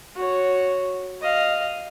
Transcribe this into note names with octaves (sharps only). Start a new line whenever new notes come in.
F#4 C#5
D#5 F5